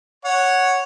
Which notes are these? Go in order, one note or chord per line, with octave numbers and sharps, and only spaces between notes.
C#5 F#5